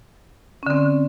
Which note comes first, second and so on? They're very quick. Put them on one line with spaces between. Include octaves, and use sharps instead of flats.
C#4 D3 C4